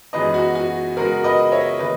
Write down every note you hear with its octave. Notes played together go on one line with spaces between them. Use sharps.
F#2 E3 G#3 B3 B4 D#5
F#4
F#4
C#3 G#3 B3 F#4 A#4
B4 D#5
C#5 E5
C#3 E3 A#3 B4 D#5